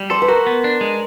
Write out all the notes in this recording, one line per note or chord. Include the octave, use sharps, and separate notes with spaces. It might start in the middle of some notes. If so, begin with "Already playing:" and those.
Already playing: G3
A4 C5 D5
B4
F#4 A#4 C5
B3
D4
G#3